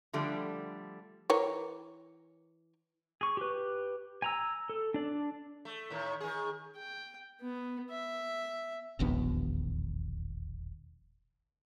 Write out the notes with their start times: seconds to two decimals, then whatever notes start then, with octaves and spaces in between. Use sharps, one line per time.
0.13 D3 F3 G3 A3
1.30 E3 A#4 C#5
3.21 G#4 C#6
3.37 G4 B4
4.22 G#5 A#5 E6
4.69 A4
4.94 D4 D5
5.65 A3
5.90 A2 D#3
6.21 D#3 G#4
6.76 G5
7.41 B3
7.90 E5
8.99 E1 A#1 D#2 B3